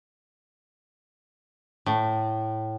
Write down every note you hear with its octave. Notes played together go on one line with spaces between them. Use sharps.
A2